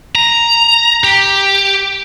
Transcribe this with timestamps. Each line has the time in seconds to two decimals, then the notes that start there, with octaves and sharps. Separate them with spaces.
0.15 A#5
1.04 G4